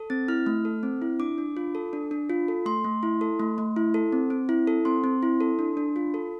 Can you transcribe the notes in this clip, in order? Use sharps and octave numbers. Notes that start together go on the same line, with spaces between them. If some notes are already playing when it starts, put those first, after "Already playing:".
Already playing: A4
C4 A6
E4 F6
A3
A4
C4
E4
D4 D6
D4
F4
A4
D4
D4
F4
A4
A3 C6
A3
E4
A4
A3
A3
E4
A4
C4
C4
E4
A4
C4 C6
C4
E4
A4
D4
D4
F4
A4